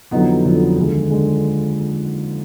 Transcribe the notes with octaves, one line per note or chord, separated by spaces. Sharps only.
F2 D3 F#3 B3 D#4
F2 D3 F#3
D#2 D3 G#3
D3 G#3